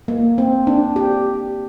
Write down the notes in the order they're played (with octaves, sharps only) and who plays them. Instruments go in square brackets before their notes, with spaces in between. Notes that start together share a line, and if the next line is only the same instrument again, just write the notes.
[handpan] A#3
C4
D4
G4